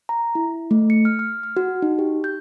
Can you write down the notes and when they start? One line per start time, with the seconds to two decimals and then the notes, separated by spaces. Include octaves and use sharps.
0.09 A#5
0.35 E4
0.71 A3
0.90 C#7
1.05 F6
1.19 F6
1.43 F6
1.57 F#4
1.82 D#4
1.99 G4
2.24 G6